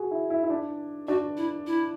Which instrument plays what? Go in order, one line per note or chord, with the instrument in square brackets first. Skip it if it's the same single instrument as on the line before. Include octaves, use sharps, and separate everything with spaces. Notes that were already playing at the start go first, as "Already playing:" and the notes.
Already playing: [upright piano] F#4 G#4
E4
E4
E4
D4
[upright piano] D4 [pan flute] F#4
[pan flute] E4
E4